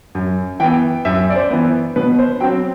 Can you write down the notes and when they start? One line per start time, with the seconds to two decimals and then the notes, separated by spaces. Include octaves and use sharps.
0.15 F#2
0.60 E3 B3 G5
1.05 F#2 E5
1.30 D5
1.36 C5
1.50 E3 B3
1.96 B2 B4
2.19 C5
2.40 F#3 C4 G5